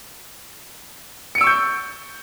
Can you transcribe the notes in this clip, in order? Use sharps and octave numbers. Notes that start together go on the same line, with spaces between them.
C#6 E6 G6 C#7 D7